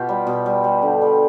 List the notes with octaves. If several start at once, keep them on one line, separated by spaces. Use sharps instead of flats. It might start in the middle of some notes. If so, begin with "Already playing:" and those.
Already playing: B2 F4 G4
G3
B2
G3
G3
D3
G3